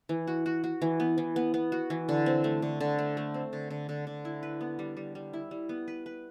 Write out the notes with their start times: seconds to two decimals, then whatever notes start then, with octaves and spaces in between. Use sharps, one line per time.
0.09 E3
0.27 F#4
0.46 F#4
0.64 F#4
0.82 E3
1.00 B3
1.18 E3
1.36 B3
1.54 B3
1.72 F#4
1.90 E3
2.09 D3
2.26 C4
2.44 A3
2.62 D3
2.80 D3
2.99 A3
3.17 A3
3.34 C4
3.53 D3
3.70 D3
3.89 D3
4.07 D3
4.25 E4
4.43 B4
4.61 B3
4.79 G3
4.97 G3
5.15 G3
5.33 E4
5.51 G3
5.69 B3
5.88 B4
6.06 B4